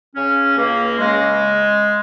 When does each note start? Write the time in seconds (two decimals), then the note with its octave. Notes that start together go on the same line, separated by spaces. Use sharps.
0.15 C#3 C#4
0.57 C#2 A#3
0.99 C#3 G#3